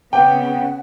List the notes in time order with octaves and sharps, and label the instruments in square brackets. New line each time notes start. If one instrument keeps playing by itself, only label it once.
[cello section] C#3 B3 [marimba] C4 B4 D6 [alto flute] F#5 [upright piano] G5